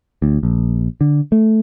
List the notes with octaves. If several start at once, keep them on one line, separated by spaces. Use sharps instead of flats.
D2
A#1
D3
A3